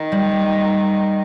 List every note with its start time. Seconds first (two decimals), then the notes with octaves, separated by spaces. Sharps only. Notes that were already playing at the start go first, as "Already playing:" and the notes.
Already playing: D#3
0.12 G3